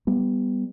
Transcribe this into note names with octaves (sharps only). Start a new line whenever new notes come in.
G3 B3